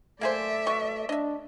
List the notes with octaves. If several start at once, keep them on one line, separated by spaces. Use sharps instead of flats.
A3 A#3 G#4 C5 D5 E5
B2 C#6
D4 D#5 E5